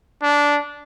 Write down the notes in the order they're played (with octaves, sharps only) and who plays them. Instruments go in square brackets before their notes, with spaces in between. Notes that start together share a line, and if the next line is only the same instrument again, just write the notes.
[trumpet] D4